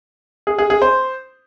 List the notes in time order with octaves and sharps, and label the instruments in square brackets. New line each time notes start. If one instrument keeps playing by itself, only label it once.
[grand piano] G#4
G#4
G#4
C5